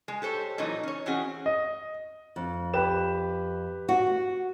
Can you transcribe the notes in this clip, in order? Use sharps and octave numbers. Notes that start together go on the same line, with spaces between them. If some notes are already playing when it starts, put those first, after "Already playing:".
G#3
G4 A4 C5 C#5
A#2 E3 F#3 D#4
C#4 C#5
E3 C4 C#4 F#4 G#4
D#5
F2
G4 B4 E7
F#4